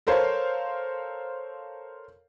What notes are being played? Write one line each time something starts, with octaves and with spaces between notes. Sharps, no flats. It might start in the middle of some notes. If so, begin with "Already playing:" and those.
A4 A#4 C5 C#5 F5